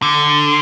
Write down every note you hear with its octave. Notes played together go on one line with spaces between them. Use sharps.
D3